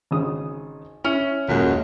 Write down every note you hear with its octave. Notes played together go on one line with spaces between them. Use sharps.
G#1 C#3 D#6
C#4 E4
D#1 F#2 G#3